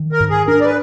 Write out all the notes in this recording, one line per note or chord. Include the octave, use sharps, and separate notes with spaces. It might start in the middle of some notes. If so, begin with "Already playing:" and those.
Already playing: D#3
A#4
G#2
G#4
D4 A#4
D5
B4